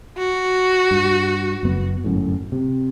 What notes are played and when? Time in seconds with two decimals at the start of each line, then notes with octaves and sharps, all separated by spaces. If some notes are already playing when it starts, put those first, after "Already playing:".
0.17 F#4
0.91 G2
1.63 F#1 F#2 B3
2.04 G1 F#2 A2
2.52 C3